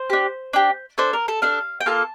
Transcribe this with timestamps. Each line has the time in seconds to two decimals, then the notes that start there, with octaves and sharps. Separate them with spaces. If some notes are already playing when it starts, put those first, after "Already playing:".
Already playing: C5
0.10 D4 G4
0.53 D4 G4
0.98 D4 A4 C5
1.13 A#4
1.28 A4
1.42 D4 A4 F5
1.80 G5
1.86 A#3 F4 A4 A5